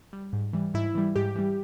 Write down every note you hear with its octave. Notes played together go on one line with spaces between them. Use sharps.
G3
G#2
E3 G3
G#2 E4
E3 G3
G#2 G4
E3 G3